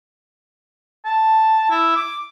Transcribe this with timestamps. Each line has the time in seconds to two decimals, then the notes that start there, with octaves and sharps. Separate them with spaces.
1.05 A5
1.71 E4
1.96 D6